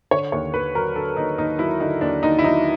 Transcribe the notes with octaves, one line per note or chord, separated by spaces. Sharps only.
D3 C#5
D#2 C#5
D#2 B4
F#3 A#4
D3 A4
D#2 D#4
D#2 D#4
F#3 E4
D3 D#4
D#2 D4
D#2 D#4
E4
F#3 D#4